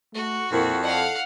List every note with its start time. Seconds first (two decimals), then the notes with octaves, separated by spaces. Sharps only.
0.15 A3 F#4
0.52 F2 A#2 E4 A#4 C5
0.83 A4 C5 D5 D#5 F5 F#5